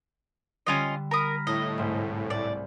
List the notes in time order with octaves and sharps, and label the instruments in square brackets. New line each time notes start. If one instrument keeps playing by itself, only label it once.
[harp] D3 G3 D4 [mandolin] C#4 F4 D#5
[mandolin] A#4 D#6 [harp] A#5 B5 F6
[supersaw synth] A2 [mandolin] D#5
[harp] C2 G#2
[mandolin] D5